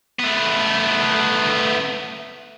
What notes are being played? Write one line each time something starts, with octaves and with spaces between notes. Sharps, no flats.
A3 B3